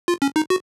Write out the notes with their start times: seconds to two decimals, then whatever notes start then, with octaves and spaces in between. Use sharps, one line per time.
0.08 F4
0.22 C#4
0.36 D#4
0.50 F#4